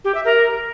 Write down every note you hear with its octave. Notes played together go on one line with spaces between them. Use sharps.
G4
E5
A#4